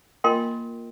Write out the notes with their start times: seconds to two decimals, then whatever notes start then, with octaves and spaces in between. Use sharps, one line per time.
0.24 A#3 F4 A#4 D#5 G5 C6